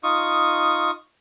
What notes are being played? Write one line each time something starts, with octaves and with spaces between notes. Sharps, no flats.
D#4 F4 C#6 D#6